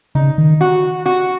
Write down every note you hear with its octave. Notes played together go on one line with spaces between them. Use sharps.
C#3 D#4
D#3
F#4
F#4